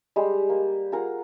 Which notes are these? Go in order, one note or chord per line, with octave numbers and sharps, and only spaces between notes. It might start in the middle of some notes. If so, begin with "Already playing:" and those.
G3 G#3 G4
A#3
F4 G#4 A#4 F#5